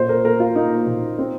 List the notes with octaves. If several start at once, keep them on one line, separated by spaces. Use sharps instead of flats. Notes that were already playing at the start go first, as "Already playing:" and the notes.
Already playing: A#2 C5
A#4
A#2 A#4
F4
A#3 D#4
A#2
C4